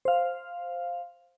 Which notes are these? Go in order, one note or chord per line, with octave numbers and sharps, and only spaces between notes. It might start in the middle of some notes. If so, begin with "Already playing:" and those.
C5 F5